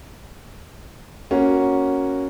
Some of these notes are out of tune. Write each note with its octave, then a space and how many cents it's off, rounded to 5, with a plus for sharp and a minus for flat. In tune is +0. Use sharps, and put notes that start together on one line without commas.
A#3 +0 C#4 +0 F#4 +0